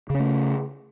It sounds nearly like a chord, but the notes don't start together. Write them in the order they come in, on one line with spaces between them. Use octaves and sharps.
C#3 C#4 A3